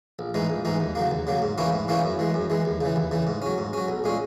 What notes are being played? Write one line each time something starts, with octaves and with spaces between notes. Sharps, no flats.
A#1
G#2 E3 G#3 D#4
A#1
G#2 E3 G#3 D#4
D#2
C#3 F#3 A#3
D#2
C#3 F#3 A#3
G#2
E3 A#3 C#4 E4
G#2
E3 A#3 C#4 E4
F#2
E3 G#3
F#2
E3 G#3
D#2
C#3 E3
D#2
C#3 E3
G#2
F#3 C#4
G#2
F#3 C#4
B1
A#2 G#3 C#4